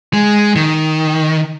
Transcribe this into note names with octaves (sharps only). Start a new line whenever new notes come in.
G#3
D#3